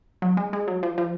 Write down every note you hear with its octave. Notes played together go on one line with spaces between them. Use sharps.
F#3
G#3
G#3
F#3
F3
F3